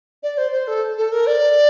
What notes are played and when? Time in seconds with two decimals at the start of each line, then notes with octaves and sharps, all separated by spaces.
0.23 D5
0.38 C5
0.52 C5
0.68 A4
0.98 A4
1.12 A#4
1.27 D5